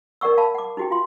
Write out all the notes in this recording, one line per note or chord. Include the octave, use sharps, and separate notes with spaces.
D#4 A#4 D5 F#5 C#6 E6
F5 A5 B5
F#5 D6
D#4 E4 F#4 G#4 G5
F4 F5 C6